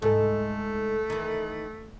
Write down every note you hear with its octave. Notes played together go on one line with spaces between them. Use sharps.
C2 G#2 A3 A4
D#3 E3